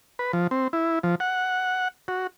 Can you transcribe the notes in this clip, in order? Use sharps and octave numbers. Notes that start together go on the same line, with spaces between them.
B4
F3
C4
E4
F3
F#5
F#4